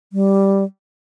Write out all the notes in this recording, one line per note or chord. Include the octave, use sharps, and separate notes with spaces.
G3